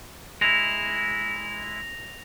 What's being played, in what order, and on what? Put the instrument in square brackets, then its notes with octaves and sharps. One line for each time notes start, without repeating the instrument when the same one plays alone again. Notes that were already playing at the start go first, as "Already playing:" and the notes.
[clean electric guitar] G#3 E4 [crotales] A#6 F7